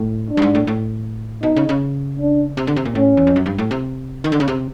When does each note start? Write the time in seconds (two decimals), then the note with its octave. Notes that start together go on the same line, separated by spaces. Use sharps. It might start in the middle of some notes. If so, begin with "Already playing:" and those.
Already playing: A2
0.30 D4
0.37 G2
0.42 G#2
0.55 A2
0.67 A2
1.43 B2 D#4
1.56 C#3
1.69 C#3
2.19 D4
2.57 C3
2.67 D3
2.76 C3
2.85 A#2
2.95 A2 C#4
3.17 E2
3.27 F2
3.36 F#2
3.46 G2
3.58 A2
3.71 C3
4.24 D#3
4.32 D3
4.40 C#3
4.48 C3